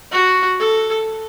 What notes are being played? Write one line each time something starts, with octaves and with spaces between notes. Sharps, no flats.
F#4
A4